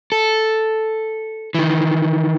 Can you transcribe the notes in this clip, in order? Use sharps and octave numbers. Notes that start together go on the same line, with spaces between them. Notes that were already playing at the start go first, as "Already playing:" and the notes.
A4
D#3 E3